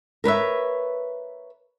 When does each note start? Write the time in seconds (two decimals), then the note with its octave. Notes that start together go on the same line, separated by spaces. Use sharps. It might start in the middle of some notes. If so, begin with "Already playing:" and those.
0.24 A#4 B4 C#5 E5